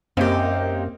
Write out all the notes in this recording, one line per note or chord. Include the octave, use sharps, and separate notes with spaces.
F#2 A#3 C4 D#4 G4